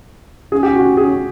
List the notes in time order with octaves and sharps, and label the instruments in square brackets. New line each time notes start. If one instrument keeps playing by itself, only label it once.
[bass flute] C#4 [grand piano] G#4
[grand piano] G4
F#4
G#4